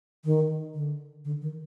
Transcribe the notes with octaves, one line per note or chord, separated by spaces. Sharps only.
D#3
D3
D3
D#3